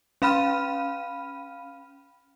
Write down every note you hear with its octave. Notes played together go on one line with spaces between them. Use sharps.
C#4 F5 B5 F6 D#7